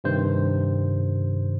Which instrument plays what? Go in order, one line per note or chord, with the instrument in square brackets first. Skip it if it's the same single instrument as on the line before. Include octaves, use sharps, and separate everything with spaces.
[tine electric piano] G2 C3 D#3 C5